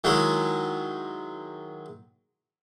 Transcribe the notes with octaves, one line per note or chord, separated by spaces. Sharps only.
D#3 F#3 G#3 E4